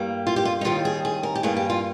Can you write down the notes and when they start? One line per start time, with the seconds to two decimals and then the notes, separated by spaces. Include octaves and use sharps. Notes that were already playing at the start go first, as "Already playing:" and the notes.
Already playing: G2 G3 A#3
0.27 F4
0.36 G4
0.45 F4
0.61 D#4
0.65 D#2 D#3 G3 F4
0.85 G#4
1.05 G#4
1.23 A#4
1.36 G4
1.43 G2 G3 A#3 G#4
1.57 G4
1.70 F4